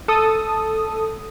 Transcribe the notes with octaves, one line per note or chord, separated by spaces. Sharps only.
A4 D#6